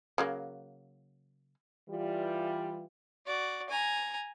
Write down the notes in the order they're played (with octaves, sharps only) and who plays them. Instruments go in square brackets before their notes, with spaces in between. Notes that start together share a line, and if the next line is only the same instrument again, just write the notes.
[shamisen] C#3 F#3 A#3
[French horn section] E3 G3 F4
[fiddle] F#4 D5
G#5 A#5